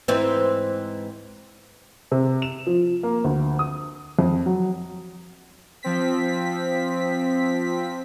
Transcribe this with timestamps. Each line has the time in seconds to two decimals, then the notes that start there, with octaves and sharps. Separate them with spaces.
0.08 G#2 E3 C4
2.12 C3
2.42 E7
2.67 F3
3.03 A#3
3.24 D2
3.59 D#6
4.19 F2
4.46 F#3
5.83 F3 C4 B6